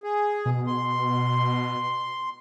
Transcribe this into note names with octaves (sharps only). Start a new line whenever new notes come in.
G#4
B2
C6